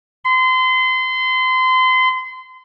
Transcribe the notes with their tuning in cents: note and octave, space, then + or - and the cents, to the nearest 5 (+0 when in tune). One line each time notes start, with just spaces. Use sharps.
C6 -30